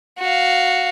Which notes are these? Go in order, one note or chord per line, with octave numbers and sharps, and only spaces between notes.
F#4 F5